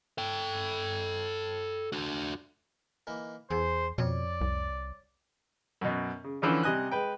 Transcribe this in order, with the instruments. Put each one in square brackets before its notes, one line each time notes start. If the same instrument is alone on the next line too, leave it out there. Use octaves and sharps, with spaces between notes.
[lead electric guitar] A4 G5
D4 F#4
[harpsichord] E3 A#3 D#4
[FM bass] E2 [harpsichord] G#4 [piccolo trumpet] C5
[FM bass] F2 [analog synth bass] B2 [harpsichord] C#5 [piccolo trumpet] D5
[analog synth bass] C2
[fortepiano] F#2 B2
C#3
D3 E3 F3 C#4
C3 G3 D#5 G#5 F#6
G#3 B4 G5